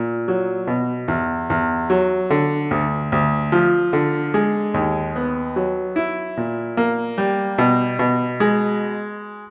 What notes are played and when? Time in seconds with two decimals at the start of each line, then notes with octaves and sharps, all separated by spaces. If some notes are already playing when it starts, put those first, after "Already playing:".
Already playing: A#2
0.28 F#3
0.67 B2
1.08 E2
1.50 E2
1.90 F#3
2.30 D3
2.71 D2
3.12 D2
3.52 F3
3.93 D3
4.34 G#3
4.74 D#2
5.16 B3
5.56 F#3
5.96 E4
6.37 A#2
6.77 A#3
7.18 G3
7.58 B2
7.99 B2
8.40 G#3